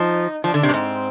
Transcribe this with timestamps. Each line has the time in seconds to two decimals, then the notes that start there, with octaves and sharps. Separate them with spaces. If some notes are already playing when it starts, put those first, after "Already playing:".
Already playing: F3 D#4
0.44 F3 D4
0.54 D3
0.63 C3
0.69 G2
0.73 G#2 C4